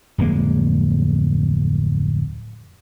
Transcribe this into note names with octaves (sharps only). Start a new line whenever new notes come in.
D1 F2 G#3 A#3